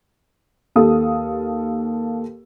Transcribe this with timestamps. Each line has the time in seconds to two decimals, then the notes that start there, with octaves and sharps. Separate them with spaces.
0.76 D#2 G4 A4 F5 D#6